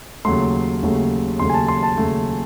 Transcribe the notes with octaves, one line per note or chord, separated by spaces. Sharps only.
D#2 C#3 F#3 A3 C6
D#2 C#3 F#3 A3
D#2 C#3 F#3 A3 C6
G#5
A5
C6
A5
D#2 C#3 F#3 A3